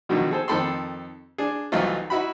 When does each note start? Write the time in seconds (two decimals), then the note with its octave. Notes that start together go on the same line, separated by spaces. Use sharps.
0.09 B2 D3 D#3 F3 F#3 A3
0.31 G#4 A4 C5
0.48 F2 D#3 C4 A4 B5 C6
1.38 D4 G#4
1.72 C2 E3 F#3 A3 D#4 F4
2.10 D#4 E4 F#4 B5